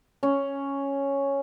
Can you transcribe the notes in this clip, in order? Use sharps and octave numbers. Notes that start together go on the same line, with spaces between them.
C#4